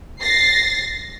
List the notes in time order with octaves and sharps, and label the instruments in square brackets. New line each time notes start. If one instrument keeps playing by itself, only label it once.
[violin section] A6 A#6 C7